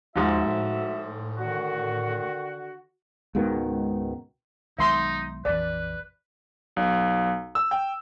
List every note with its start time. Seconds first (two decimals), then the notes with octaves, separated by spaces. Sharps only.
0.16 D#2 G#2 F3 F#4 E5
0.45 A2
1.37 D3 D#3 F#4
3.35 C#2 G#2 B2 D#3
4.78 B1 D#3 G#3 D#4 E5 C6
5.45 A#1 F2 E3 B4 D5
6.76 B1
7.55 E6
7.71 G5